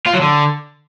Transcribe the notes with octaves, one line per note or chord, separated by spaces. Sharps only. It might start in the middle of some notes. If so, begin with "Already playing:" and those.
F4
F#3
D3